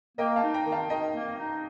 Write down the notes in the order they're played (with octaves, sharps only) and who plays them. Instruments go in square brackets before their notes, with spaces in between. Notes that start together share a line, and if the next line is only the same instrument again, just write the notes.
[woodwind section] A#3 [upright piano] D#5 G5
[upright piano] F5 A5
[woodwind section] D#4
[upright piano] G5 A#5
[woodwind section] D#3
[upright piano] F5 A5
[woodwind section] D#3 [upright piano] D#5 G5
[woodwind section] A#3
D#4